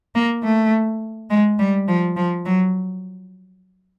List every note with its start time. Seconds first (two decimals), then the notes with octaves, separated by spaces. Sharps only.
0.15 A#3
0.43 A3
1.30 G#3
1.59 G3
1.88 F3
2.17 F3
2.46 F#3